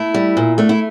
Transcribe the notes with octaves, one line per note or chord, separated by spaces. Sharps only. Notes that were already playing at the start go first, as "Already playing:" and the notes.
Already playing: A3 E4
G3
A#2
A3 D4
E4